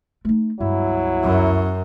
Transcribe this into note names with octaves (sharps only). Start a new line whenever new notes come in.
A3 D#4
C#2 G2 B2 F#3 E4
F#2